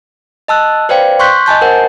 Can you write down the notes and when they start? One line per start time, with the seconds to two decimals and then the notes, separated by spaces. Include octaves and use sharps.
0.48 D#5 A5 E6 F#6
0.89 B4 C5 D5 F5 G5
1.19 C6 C#6 F#6 G6 B6
1.46 D#5 G#5 A5 G6
1.62 A#4 C5 F#5